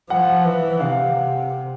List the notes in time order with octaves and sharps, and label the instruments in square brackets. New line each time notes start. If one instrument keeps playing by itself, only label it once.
[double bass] F3 [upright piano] F#5
[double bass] E3
[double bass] C3 [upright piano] F5